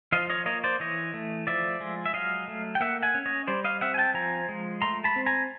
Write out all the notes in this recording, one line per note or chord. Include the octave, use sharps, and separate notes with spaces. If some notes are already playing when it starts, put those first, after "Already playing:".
F3 D#5 F5
C#5 D#5
A#3 C#5 D#5
C5 D5
E3 C#5 D#5
A3
F3 D5 E5
G#3
E5
F#3 D#5 F5
A3
G5
A#3 E5 F#5
F#5 G#5
C#4
C#5 D#5
G3 C5 D5
D#5 F5
C4 E5 F#5
G#5
G5 A5
F3 G#5 A#5
G#3
A3 A#5 C6
A5 B5
C4
G#5 A#5